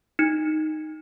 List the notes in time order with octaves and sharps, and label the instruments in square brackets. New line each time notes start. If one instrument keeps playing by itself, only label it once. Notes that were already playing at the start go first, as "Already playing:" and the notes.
[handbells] D#4